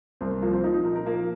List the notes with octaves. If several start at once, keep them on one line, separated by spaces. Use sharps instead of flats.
C2 C4
C4
F3 A#3
C4
F3 D#4
D#4
A#2 A#4
A#4
F3 A#3